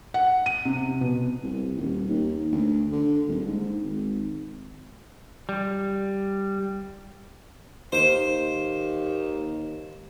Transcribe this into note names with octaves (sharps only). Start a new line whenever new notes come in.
F#5
D#7
C3
B2
C2
D#1
D#2
D2
D3
D#1
G#2
G#1
G3
D#2 C5